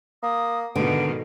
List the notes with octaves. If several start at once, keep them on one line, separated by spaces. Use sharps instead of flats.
A#3 D#6
G#2 B2 D3 D#3 B3 D7